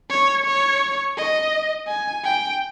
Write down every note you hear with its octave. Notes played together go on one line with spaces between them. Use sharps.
C#5
C#5
D#5
G#5
G5